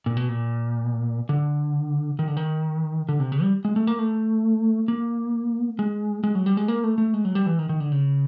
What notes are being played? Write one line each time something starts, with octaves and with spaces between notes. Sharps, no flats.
A#2
B2
A#2
D3
D#3
D3
D#3
D3
C3
C#3
G3
G#3
A3
A#3
A3
A#3
G#3
G#3
F#3
G3
G#3
A#3
A3
A3
G#3
F#3
G3
E3
D#3
D#3
D3
C#3